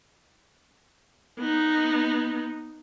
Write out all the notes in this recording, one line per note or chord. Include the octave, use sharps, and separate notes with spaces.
B3 D#4